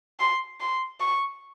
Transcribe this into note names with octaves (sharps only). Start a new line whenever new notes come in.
C6
C6
C#6